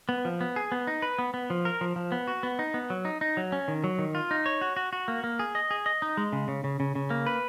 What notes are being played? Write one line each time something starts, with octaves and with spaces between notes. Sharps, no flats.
B3
F3
B3
G#4
B3
D#4
B4
B3
B3
F3
A#4
F3
F3
B3
F#4
B3
D#4
B3
F#3
D#4
D#4
F#3
C#4
D#3
F#3
D#3
F4
D#4
C#5
F#4
F#4
F#4
A#3
A#3
G#4
D#5
G#4
D#5
D#4
G#3
C#3
C#3
C#3
C#3
C#3
A#3
B4